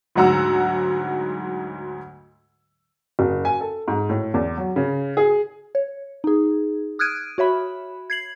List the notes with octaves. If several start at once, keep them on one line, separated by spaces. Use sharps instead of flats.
D2 G#2 F#3 F#5 A#5 E6
F#1
G#5
A4
G#2
A2
E2
F#3
C#3
G#4
C#5
D#4 G#4
D#6 F6 F#6 G#6 D7 D#7
F#4 C#5 E5 B5
G#6 C7 F#7